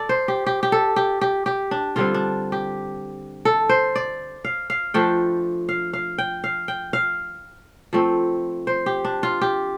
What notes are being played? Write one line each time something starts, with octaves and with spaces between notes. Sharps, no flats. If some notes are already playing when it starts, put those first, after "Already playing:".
Already playing: A4 D5
C5
G4
G4
G4
A4
G4
G4
G4
D4
D3 G3 C4 F4
D4
G4
A4
C5
D5
F5
F5
F3 A3 D4 G5
F5
F5
G5
F5
G5
F5
F3 A3 C4
C5
G4
D4
F4
G4